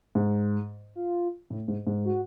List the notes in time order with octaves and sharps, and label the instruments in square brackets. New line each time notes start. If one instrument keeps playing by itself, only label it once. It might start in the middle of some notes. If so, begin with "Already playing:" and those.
[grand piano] G#2
[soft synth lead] F4
[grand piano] A2
G#2
G#2
[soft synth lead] F#4